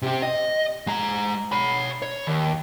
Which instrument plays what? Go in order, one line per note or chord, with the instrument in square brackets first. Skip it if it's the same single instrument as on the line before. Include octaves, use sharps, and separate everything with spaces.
[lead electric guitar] C3 C4
D#5
G#3 A#5
C#5 B5
C#5
D#2